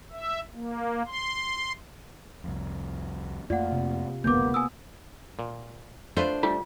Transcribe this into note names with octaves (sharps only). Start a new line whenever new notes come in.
E5
A#3
C6
C2 F2
F2 A3 A#3 F4 D5 F#5
C3
F#1 D2 G2 A#3 B3 D6 G6
G#5 D#6 E6
A#2
A3 D4 F4 B4 C5
G3 A3 F4